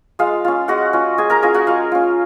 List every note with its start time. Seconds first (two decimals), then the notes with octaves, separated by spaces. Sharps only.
0.19 G#3 F4 F5
0.45 C#4 F4
0.68 G#3 F#4 F#5
0.93 C#4 F4
1.18 G#3 G#4 G#5
1.30 A#4 A#5
1.43 C#4 F4 G#4 G#5
1.54 F#4 F#5
1.67 G#3 F4 F5
1.92 C#4 F4